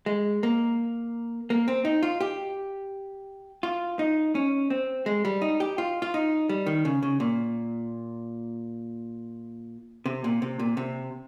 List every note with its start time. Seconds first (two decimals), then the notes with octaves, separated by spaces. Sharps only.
0.06 G#3
0.43 A#3
1.50 A#3
1.68 C4
1.85 D#4
2.03 F4
2.21 G4
3.63 F4
3.99 D#4
4.35 C#4
4.70 C4
5.06 G#3
5.25 G3
5.42 D#4
5.60 G4
5.78 F4
6.02 F4
6.14 D#4
6.49 G3
6.66 D#3
6.85 C#3
7.03 C#3
7.20 A#2
10.06 C3
10.24 A#2
10.42 C3
10.59 A#2
10.77 C3